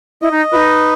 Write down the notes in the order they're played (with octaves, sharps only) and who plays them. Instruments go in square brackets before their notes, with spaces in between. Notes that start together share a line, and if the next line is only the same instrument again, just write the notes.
[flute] E4 [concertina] D#5
[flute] D#4
[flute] D#4 F4 [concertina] B4